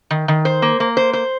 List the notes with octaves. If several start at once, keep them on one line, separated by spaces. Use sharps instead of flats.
D#3
D#3
C5
A#3
A#3
C5
C5